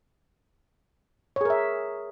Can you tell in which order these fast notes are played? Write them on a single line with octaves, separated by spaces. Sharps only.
C#5 G#4 A#4 E5